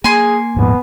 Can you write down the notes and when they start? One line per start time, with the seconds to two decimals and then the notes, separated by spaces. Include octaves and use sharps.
0.04 A#3 G#4 G#5 C6
0.56 D#1 G#2 F3 B3